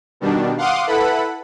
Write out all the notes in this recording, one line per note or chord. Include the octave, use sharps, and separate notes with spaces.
B2 D#3 G3 D4
F5 F#5 C6 D6 D#6
E4 A4 B4 F#5 B5